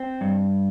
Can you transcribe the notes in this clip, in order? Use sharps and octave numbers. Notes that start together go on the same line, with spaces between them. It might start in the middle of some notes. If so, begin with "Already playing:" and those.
Already playing: C4
G2